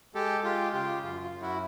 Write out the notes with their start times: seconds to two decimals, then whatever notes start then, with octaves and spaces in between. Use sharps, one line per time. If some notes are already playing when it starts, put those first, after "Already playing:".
0.14 G#3 G4 A4
0.44 G#3 F4 G4
0.73 C#3 F4 G4
1.02 F#2 F4
1.22 F4
1.32 F#2
1.41 E4 F#4